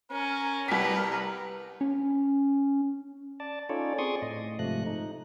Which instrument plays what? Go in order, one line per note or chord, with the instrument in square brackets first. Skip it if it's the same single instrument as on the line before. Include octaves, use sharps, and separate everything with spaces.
[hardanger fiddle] C#4 [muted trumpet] A#4
[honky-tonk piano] C2 B6 [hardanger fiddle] G4 B4
[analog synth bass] C#4
[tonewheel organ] D5 A5
C#4 D#4 F4 A4 C#5 D5
C4 G#4 D5 C6 C#6 D#6
A2 D#5
G#2 C3 F3 A3 F#6
D#4